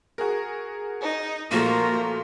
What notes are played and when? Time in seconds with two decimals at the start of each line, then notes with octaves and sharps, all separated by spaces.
0.18 F#4 G#4 A#4
1.01 D#4
1.51 A#2 F3 A3 A#3 F4 F#4 A#4 A#5